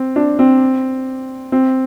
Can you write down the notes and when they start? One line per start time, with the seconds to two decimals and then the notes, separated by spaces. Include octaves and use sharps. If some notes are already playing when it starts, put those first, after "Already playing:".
Already playing: C4
0.16 D4
0.39 C4
1.52 C4